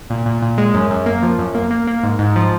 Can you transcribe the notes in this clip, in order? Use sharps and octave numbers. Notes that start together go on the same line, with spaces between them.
A#2
A#2
A#2
G#3
F#2
F#2
A#3
F3
F#2
A#3
A#3
A#3
G#2
G#2
F3